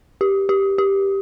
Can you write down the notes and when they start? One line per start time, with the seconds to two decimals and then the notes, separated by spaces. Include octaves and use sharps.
0.21 G4
0.49 G4
0.78 G4